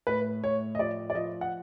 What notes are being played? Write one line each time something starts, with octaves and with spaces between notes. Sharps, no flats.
A2 B4
A2 C#5
D#5
F3 D5
D5
F3 D#5
F#5